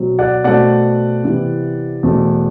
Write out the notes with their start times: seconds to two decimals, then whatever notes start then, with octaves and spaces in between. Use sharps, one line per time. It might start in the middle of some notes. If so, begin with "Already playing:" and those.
Already playing: B2 F#3 C4
0.19 D5 F#5
0.44 B2 A3 C4 D5 F#5
1.24 C3 E3 B3
2.03 E2 B2 A3 C4